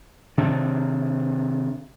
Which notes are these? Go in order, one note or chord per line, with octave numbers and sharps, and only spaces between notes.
C3 D#3 D4